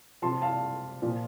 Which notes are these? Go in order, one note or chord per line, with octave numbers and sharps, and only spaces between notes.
C3 F3 A5 C6
F5 A5
A#2 F3